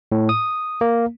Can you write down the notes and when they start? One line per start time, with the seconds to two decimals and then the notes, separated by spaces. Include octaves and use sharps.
0.12 A2
0.29 D#6
0.81 A#3